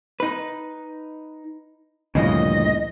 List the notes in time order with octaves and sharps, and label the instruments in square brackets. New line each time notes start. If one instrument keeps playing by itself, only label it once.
[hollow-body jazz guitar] D#4 B4
[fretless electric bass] D2 G2 A#2 [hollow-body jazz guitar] C#3 E3 F3 [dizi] D#5